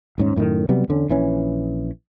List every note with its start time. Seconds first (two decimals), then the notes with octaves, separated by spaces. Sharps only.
0.18 D#1 G#2 C#4
0.36 F#2 A2 D3 D#3
0.69 C3 F#3 G3 B3
0.88 E2 D3 C#4
1.09 A#1 E3 C#4